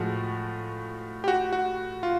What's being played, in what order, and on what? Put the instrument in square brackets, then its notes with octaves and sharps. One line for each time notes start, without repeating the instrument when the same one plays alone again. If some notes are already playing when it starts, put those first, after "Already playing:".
Already playing: [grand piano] A2 F3 G#3 [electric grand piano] F#4
[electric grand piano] G4
F#4
F#4
F4